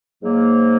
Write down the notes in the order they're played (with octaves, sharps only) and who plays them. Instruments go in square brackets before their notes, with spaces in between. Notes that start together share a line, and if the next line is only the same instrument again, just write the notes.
[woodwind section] G#2 F#3 A#3